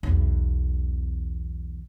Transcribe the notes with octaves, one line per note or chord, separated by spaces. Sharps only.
B1 E2